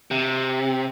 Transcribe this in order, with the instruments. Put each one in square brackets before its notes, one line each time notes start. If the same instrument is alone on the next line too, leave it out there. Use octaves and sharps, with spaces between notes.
[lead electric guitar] C3